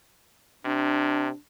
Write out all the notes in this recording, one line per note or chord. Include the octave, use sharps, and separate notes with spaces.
C3 D4